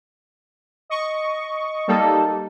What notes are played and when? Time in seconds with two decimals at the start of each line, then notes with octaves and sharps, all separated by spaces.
0.90 D#5 C#6
1.88 G3 A#3 D#4 A4